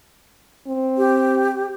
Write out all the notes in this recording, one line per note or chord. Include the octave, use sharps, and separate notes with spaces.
C4
G4